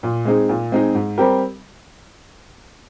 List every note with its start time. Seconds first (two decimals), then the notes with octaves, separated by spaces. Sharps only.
0.03 A#2
0.25 G#3 C4 D#4 G#4
0.49 A#2
0.72 G#3 C4 D#4 G#4
0.95 G#2
1.18 G3 C4 G4 A#4